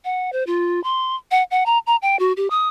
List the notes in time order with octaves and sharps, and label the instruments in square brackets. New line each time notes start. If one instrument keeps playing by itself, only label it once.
[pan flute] F#5
C5
F4
C6
F#5
F#5
A#5
A#5
G5
F#4
G4
D#6